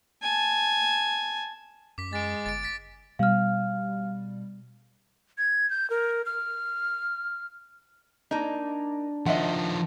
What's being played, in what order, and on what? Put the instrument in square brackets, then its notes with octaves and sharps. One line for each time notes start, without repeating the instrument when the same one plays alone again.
[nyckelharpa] G#5 A5
[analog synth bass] F#2 [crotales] D6 B6
[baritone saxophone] G#3 [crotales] A6 D7
[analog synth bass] G1 [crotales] A6 D7
[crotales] A6 B6 D7
[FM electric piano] B2 G3 [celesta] F5 F6
[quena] G#6
G6
A#4
F6
[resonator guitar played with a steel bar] A#3 D#4 [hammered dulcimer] D4 D5
[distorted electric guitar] D#3 F3 [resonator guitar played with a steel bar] D#5 E5 F#5 [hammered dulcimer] C6